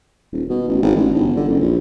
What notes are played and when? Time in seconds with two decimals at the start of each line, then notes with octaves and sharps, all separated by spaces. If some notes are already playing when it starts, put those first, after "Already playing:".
0.33 D#1
0.49 B2
0.68 A1
0.82 G#1
0.96 A1
1.14 G1
1.37 D3
1.48 F#1
1.61 A#1